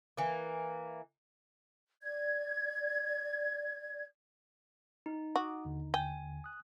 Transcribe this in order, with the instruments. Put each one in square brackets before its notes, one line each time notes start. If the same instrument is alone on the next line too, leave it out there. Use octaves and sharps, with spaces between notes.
[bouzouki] E3 A#3
[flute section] D5 G#6
[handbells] D#4
[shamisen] F#4 [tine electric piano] A#5 D6 D#6
[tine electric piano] D#2 D3
[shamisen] G5 [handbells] G#5
[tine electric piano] D#6 F#6